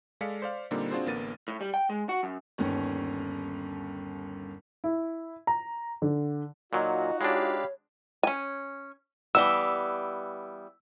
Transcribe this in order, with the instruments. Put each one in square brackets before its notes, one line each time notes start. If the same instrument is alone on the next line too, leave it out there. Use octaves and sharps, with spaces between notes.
[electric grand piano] G#3 A4 D5 F5 B6 C#7
C5 D5 F5
A#2 D3 G3 A#3 C4 D#4
C4 D4 F4 F#4 G#4 C5
A1 D3 A#3 B3 A6 D#7
[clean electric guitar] A2
G3
G5
G#3
F#4
F#2
[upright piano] G1 D#2 C#4
E4
A#5
D3
[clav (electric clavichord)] A#2 F#3 [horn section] D#4 F4 F#4 [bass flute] D#5
[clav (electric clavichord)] G#3 D4 [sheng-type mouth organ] G4 F5 B5 [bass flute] C#5
[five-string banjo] C#4 G#5
[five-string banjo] E3 G3 B3 [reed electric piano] E6